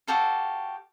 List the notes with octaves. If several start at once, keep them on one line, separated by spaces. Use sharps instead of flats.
F#4 G4 A4 F5